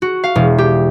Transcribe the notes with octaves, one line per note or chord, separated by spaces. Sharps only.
F#4
F5
E1
G4